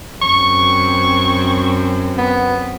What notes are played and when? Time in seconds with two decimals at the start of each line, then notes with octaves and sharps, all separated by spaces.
0.22 F#2 C4 C#6
2.18 B3